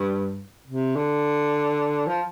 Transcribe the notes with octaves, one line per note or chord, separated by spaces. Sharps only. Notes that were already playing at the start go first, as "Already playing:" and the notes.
Already playing: G2
C3
D3
F3